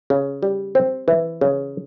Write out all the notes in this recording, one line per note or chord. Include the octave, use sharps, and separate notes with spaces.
C#3
G3
C4
E3
C#3